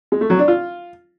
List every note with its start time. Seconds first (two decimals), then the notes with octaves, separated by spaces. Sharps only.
0.12 G#3
0.21 A3
0.30 F#3
0.39 D4
0.48 F4